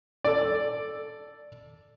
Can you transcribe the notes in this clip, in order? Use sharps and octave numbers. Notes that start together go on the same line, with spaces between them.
A4 D5